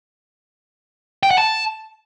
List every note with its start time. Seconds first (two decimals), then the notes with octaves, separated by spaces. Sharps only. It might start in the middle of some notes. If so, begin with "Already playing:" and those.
1.23 G5
1.31 F#5
1.38 A5